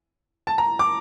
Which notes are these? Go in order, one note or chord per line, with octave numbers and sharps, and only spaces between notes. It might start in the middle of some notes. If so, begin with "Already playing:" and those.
A5
A#5
D6